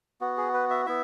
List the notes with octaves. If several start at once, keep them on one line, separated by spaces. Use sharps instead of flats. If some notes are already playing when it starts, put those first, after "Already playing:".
B3 F#4
G#4
B4
E5
B3 E4 E5